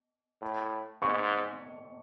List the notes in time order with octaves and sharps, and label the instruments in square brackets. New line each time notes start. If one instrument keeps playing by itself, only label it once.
[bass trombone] A2
[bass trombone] G#2 [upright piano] C#6